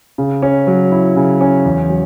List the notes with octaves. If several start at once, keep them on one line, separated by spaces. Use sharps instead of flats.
C#3
C#4
F#3
E4
C#3
C#4
E2
F#3